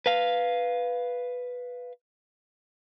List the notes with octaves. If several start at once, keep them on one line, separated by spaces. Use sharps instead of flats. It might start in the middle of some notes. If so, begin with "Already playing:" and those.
B4 F5